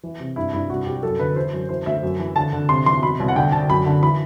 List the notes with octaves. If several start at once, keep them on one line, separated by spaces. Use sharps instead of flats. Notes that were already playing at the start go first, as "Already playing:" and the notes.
E3
C3
G2 E4
G2 E4
C2 F#4
C2 G4
F#2 A4
D3 B4
E3 C5
F#2
E3 C5
D2 E5
F#2
E3
D3 A5
D3
C3 C6
E3 C6
B2 B5
C2
F#5
D3 G5
D3 A5
F#2 B5
D3
E3 B5